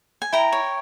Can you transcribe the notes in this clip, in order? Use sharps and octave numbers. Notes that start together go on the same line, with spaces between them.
G#5
E4 G5 A#5
C#5